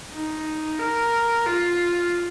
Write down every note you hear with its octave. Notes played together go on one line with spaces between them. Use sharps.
D#4
A#4
F4